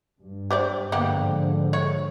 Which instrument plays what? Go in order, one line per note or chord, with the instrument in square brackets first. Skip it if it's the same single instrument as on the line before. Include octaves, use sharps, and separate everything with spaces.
[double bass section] G2
[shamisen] G4 C5 D5
[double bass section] G#2 D3 F3 [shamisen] A#3 B3 G4
[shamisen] C#5